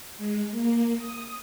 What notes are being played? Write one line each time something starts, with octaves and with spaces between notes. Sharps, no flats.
G#3
A#3
D#6